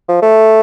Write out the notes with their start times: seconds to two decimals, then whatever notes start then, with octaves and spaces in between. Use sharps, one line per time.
0.09 F3
0.22 A3